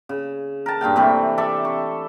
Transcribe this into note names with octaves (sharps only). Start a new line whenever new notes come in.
C#3
A#4 A5
G2 A#2 F5 G5
C3 E3 A3 C4
A4 D5 E5
C#6